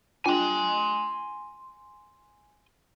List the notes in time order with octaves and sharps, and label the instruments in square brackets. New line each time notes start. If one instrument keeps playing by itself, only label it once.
[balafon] D4 F4 G5 [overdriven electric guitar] G#5 C6